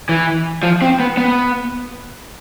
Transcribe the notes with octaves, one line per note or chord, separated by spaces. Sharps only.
E3
F3
C4
B3
B3